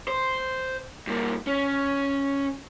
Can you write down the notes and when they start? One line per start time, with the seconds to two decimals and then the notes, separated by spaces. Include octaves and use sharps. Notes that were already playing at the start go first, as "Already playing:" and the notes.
0.08 C5
1.07 G2 A#3
1.47 C#4